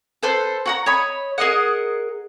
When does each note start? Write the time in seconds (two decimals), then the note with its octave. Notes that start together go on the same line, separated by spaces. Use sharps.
0.23 A4 B4 C5
0.66 F#4 F#5 A#5
0.86 C#5 D#5 B5
1.38 G#4 A#4 D#5 F#5